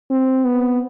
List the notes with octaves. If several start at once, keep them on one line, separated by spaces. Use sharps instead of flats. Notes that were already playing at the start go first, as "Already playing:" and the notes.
C4
B3